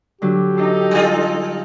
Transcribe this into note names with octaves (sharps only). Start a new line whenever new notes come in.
D3 F#3 G4
D#4 A4
G3 F4